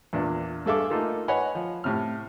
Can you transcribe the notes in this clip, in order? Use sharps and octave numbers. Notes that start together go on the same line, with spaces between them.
E2 A#2 D4
G2 G#4 A4 E5 F5 D6
A3 A#3 D#4 F4 A4
B4 C#5 D#5 F#5 G#5 B5
F3
A2 C3 F6